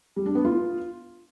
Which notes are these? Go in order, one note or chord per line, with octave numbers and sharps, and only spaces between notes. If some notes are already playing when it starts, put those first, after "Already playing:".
G3
D4
B3
F4